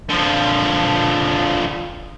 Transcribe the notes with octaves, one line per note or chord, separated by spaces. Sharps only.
D3 F3